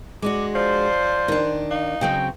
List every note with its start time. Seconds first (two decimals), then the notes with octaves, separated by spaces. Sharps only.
0.22 G#3 D4 F#4 D6
0.55 F3 C5 D5
1.28 D#3 D4
1.71 D#4 F5
2.01 C#3 F#3 C4 G5